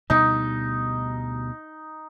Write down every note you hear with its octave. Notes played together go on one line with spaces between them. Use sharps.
D2 B2 G3 D#4